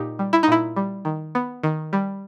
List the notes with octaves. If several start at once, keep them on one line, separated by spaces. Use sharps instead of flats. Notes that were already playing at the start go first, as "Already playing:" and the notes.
Already playing: A#2 D#4 G4
G3
E4
D#4
A#2 E4
G3
D#3
B3
D#3
G3